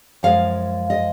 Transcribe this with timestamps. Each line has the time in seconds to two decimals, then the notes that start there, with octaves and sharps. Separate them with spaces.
0.23 F#2 F3 G#3 F5
0.90 D#5